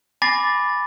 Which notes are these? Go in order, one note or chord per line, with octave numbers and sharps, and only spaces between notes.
G#5 B5 D6 A6 A#6 C7